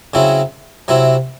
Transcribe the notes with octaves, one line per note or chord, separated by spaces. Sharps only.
C#3 F#3 C4 E4
C3 F#3 C4 E4